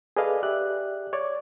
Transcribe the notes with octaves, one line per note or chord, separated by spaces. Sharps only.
G#4 A4 B4 D5 D#5 F5
G4 D5 E5 F#6
C#5 D5